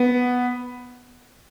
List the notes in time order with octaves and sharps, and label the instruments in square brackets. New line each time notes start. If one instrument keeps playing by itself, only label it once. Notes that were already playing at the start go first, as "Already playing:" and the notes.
Already playing: [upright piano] B3